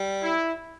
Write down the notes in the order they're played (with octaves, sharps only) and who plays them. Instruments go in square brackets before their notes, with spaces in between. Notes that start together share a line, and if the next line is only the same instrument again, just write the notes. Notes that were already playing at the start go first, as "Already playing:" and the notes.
Already playing: [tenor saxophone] G3
[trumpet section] E4